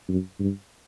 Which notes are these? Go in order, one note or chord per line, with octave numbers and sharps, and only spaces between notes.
F#2
G2